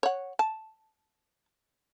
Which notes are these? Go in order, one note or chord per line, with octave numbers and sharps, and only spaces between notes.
C#5 F#5
A5